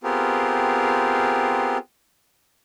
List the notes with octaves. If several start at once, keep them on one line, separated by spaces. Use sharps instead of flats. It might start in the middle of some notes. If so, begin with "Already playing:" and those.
B3 C4 F4 G4 G#4 A#4